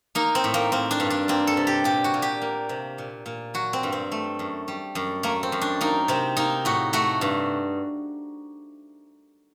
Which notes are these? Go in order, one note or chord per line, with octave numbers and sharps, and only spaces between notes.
A#3 D#4
C4
A2
A#3
A#3 C4
D4
G2
D4
A#3 C4
A4
C3
G4
A#2 G4
F#4
A#2
G4
A#3
C3
A#2
A#2
F#3 F#4
C4
G2
C4
A3
F#2
G3
F#2
A3 A#3
C4
F#2
D4
A#3 D#4
C3 C4
A#3 D#4
A2 F#4
A3 F#4
G2